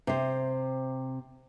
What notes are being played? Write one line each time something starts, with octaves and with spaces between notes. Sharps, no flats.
C3 C5